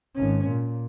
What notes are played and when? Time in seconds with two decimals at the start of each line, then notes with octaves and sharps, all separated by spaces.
0.15 G#1 C#4
0.48 A#2